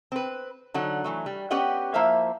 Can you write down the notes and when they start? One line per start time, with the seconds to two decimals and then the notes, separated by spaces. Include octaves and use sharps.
0.12 C4 B4
0.74 D3 F#3 D#4 F#5
1.04 E3 F#3 A3
1.26 G3
1.50 B3 C#4 G4 D#5 F#5 G5
1.94 F3 A#3 E4 C5 E5 F5